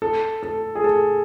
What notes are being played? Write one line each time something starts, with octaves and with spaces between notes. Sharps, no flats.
A4
A4
G#4
A4